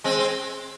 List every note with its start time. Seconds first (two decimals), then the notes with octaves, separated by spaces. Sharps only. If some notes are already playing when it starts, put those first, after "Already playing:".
0.04 G#3 C4
0.19 C4